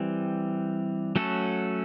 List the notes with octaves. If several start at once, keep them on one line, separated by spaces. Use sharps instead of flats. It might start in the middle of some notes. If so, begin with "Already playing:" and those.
Already playing: E3 G3 C4
F#3 A3 C#4 F#4 A4